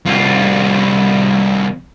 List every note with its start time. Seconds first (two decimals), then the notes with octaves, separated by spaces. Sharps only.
0.07 C2 F4